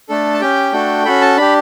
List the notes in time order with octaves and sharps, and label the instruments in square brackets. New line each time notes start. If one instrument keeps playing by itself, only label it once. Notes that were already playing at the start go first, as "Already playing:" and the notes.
[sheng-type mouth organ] A3 D4 A4
A5
C#4 G4 G5
A3 D4 F#4 A4
C#4 F#4 A4 B5
A5
D4 G4 B5